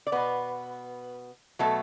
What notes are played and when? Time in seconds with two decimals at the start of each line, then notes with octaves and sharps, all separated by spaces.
0.07 D5
0.12 B2 B3 B4
1.59 B2 F#3 A3 A4